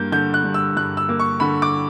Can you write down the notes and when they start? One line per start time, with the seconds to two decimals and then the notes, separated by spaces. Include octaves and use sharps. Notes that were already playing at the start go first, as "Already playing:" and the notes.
Already playing: G2 A#3 G6
0.12 D3 G6
0.34 F#6
0.44 G2
0.54 E6
0.76 G2 F#6
0.97 E6
1.09 A#3
1.19 C#6
1.40 D3 B5
1.62 D6